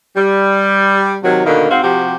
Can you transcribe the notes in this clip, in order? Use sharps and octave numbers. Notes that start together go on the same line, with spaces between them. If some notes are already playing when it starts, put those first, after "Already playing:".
G3
C3 D#3 F#3
B2 D3 D#3 A#3
G#2 C4 F#4 F5
C3 F3 F#4 G4